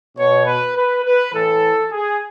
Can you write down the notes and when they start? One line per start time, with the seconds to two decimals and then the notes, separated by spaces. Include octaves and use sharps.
0.17 B2 C#5
0.46 B4
0.75 B4
1.04 B4
1.33 A2 E3 A4
1.91 G#4